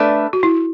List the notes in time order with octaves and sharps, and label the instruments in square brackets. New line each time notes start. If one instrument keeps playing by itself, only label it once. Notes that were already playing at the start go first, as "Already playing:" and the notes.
Already playing: [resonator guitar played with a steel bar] A3 D4 B4 E5 [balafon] A4
[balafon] F#4
E4